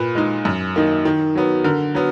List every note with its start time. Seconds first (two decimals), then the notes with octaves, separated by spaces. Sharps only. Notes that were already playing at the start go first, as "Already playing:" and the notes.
Already playing: A#2 B4
0.15 G#3 D#4
0.45 F#2
0.76 D#3 A#3 D#4
1.05 D#3
1.35 F#3 B3
1.64 D3 A#4
1.95 F#3 B3